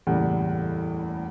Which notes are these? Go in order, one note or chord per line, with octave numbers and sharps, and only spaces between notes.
F#1 E2 A2 G3